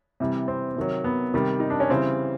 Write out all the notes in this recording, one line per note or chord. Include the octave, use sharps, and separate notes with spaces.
C3 E3 G3
C4
C3 D#3 F#3
B3
C3 D#3 G3
D#4
D4
C#4
C#3 E3 G3 C4